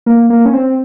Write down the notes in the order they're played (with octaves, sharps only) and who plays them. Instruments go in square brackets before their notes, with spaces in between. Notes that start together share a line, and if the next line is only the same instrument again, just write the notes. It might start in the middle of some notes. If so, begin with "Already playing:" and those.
[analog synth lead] A#3
A#3
C#4
C4